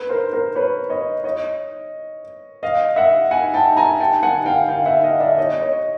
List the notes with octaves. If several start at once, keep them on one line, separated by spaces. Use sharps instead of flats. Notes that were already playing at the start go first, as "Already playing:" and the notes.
Already playing: B4
A#4 C5
A#4 C5
B4 C#5
C#5 D#5
C#5 D#5
D#5 F5
E5 F#5
F#5 G#5
G5 A5
G#5 A#5
G5 A5
F#5 G#5
F5 G5
F5 G5
E5 F#5
D#5 F5
D5 E5
C#5 D#5
C#5 D#5